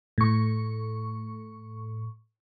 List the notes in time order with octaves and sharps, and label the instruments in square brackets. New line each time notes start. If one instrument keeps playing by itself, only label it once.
[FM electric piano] A2 C#6